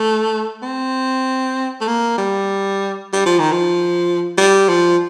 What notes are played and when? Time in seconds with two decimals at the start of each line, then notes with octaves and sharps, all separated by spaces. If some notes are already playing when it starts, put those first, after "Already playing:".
Already playing: A3
0.62 C4
1.81 A3
1.88 A#3
2.18 G3
3.13 G3
3.26 F3
3.39 D#3
3.52 F3
4.38 G3
4.69 F3